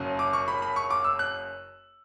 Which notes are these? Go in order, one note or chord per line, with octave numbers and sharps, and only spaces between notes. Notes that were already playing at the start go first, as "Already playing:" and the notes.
Already playing: F#1 F#2 C#3
D6
C#6
B5
B5
C#6
D6
E6
F#6